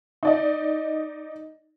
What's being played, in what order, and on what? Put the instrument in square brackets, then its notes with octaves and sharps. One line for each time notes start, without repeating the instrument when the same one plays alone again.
[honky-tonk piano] D#4 D5 D#5